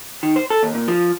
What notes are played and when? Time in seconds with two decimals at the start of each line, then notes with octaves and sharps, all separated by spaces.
0.23 D#3
0.36 C5
0.50 A4
0.63 D#2
0.75 A#2
0.88 F3